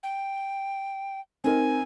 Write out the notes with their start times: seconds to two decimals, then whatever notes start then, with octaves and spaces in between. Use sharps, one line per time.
0.03 G5
1.44 C4 D#4 A#4 G#5